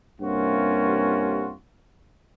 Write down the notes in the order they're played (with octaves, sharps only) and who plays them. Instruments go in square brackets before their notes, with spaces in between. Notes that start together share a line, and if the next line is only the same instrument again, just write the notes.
[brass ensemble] G2 C3 A#3 C#4 F4 F#4